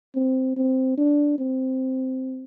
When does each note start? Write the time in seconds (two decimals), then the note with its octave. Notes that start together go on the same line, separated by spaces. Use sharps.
0.15 C4
0.57 C4
0.98 D4
1.39 C4